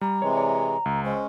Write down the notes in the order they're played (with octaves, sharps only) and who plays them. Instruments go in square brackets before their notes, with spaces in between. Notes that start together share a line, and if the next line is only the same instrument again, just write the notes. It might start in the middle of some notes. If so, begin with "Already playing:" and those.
[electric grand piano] G3 [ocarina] A#5
[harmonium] C3 E3 G#3 [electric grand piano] C#5
[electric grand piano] C#5 D5
C#2
[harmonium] G#3 C#4 [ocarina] C5